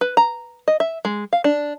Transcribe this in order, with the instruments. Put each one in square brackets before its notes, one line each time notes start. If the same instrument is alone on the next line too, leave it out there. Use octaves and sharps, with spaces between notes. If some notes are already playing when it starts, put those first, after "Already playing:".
[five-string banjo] B4
A#5
D#5
E5
G#3
F5
D4